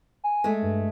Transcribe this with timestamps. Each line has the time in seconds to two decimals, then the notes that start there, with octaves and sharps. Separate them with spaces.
0.24 G#5
0.44 G#3 A3
0.62 G2